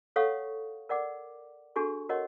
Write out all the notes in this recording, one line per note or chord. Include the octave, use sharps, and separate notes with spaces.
A4 C#5 F5 F#5 C#6 D#6
A#4 D5 F#5 D6
D4 F#4 G#4 A4 C#6
F#4 A#4 C#5 D#5 F#5